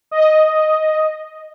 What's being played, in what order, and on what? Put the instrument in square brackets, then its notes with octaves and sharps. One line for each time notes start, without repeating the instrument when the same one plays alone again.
[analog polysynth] D#5